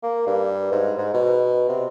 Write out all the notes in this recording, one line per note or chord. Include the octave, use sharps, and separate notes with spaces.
A#3
G2
G#2
G#2
B2
C3